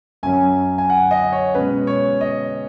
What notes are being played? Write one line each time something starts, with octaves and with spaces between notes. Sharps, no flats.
F#2 F#3 C#4 G#5
G#5
F#5
D#5
C#5
B2 G#3 C#4 B4
C#5
D#5